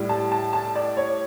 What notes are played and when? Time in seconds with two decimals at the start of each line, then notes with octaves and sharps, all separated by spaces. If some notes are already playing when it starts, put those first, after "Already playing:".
Already playing: A2 G3
0.09 A5
0.32 A5
0.53 A5
0.76 D5
0.97 C#5